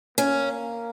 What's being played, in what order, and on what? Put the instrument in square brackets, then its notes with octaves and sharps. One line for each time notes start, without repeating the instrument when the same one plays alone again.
[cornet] A#3 [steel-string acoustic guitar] C#4